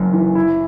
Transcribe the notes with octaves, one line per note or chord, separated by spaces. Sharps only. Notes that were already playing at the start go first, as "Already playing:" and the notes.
Already playing: F#1 F#2
E3
E4